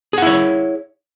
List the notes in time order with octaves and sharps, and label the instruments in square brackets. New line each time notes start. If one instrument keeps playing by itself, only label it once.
[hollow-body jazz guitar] G#4
F#5
E4
C#5